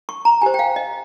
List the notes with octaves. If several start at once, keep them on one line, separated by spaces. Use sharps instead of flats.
C#6
A#5
G4 C5 G#5
G5
F5
D#5